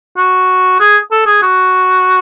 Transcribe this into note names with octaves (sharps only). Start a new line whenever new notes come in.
F#4
G#4
A4
G#4
F#4